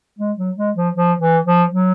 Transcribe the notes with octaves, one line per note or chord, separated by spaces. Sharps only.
G#3
F#3
G#3
F3
F3
E3
F3
F#3